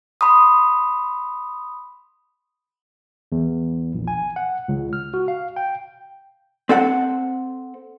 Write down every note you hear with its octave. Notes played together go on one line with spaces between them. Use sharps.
B5 C6 D#6
E2
A#1
G#5
F#5
C#2
F6
F#4
F5
G5
C4 A4 F#5